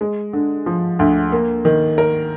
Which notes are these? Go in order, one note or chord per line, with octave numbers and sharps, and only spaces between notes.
G#3
D3
F3
D2
A#3
D#3
A#4